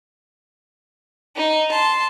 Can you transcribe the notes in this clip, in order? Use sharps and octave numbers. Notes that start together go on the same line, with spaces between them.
D#4
A5 C6